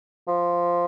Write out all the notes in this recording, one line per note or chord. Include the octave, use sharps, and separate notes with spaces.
F3